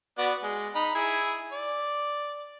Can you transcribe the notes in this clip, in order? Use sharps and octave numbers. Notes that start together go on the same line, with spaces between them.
B3 F#4 D5
G#3
D#4 B5
E4 G#4 G#5
D5